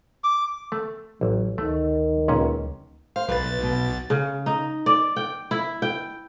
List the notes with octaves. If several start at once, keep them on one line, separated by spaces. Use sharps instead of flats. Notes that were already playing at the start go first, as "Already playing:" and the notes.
D6
A3
A1 F#3
D2 D#3 A3
C#2 A#2 C#4
C5 F5
B1 B4 A6
B2
C#3
D#4
D5
G5
E4
G5